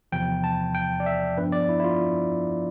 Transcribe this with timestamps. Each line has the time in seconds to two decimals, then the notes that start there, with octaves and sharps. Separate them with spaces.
0.12 E2 C3 F3 G5
0.44 A5
0.75 G5
1.00 D5
1.06 E5
1.37 G2 F3 B3 D4 B4
1.52 D5
1.69 E4
1.80 E4
1.84 F4